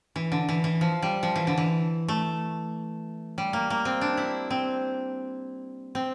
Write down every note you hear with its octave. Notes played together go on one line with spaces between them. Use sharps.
E3
D3
E3
E3
F3
G3
F3
E3
D3
E3
A3
G3
A#3
A#3
C4
D4
E4
C4
C4